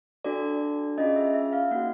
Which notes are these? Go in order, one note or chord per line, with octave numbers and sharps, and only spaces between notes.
D4 F#4 A4 D5
C#4 F4 G#4 D#5
E5
E5
F5
A#3 D#4 F#4 F#5